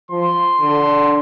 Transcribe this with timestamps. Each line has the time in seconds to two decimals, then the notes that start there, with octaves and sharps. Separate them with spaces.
0.11 F3 C6
0.61 D3